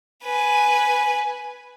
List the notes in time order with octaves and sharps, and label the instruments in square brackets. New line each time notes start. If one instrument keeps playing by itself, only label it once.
[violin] B4 G#5